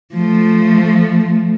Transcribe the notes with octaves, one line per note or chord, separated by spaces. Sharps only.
F3 A3